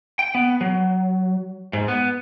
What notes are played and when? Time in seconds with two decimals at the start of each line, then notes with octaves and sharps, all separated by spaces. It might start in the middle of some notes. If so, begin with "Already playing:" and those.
0.19 G5
0.35 B3
0.61 F#3
1.73 G#2
1.88 B3